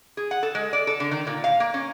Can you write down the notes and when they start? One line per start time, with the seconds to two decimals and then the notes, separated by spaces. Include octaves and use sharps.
0.17 G#4
0.31 F#5
0.43 A4
0.55 G#3
0.73 D5
0.87 A4
1.00 D3
1.11 D#3
1.27 A#2
1.44 F5
1.60 A#3
1.74 C#4